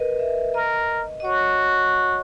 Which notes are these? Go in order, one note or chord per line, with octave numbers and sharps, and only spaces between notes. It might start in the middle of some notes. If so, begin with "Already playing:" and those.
Already playing: A#4 B4 D#5
E5
A#4 D#5
D#5
F#4 C#5